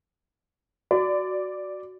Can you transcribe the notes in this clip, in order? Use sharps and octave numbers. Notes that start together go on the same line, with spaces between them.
F#4 D5